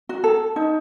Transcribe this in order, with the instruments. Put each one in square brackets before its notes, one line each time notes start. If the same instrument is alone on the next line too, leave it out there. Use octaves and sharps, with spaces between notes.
[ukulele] F#4
A4
D#4